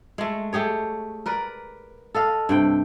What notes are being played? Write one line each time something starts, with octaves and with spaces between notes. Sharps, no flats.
G#3 A3
A3 G4 G#4 C#5
A#4 B4 D5
A4 D#5 F5
G2 C3 G5